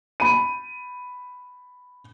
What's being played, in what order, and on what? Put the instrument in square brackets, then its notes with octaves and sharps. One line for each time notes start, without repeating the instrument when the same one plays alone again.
[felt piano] B5 D#7